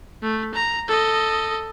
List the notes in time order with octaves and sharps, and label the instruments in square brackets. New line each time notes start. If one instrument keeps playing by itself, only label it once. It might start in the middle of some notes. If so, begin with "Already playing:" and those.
[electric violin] A3
A#5
A4 D#5